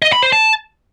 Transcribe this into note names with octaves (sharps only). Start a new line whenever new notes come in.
D#5
B5
C5
A5